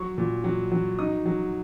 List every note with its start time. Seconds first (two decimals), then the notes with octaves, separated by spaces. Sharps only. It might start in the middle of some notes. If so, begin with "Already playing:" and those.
Already playing: F#3 C#6
0.18 A#2
0.44 F#3
0.72 F#3
0.99 D#4 D#6
1.26 F#3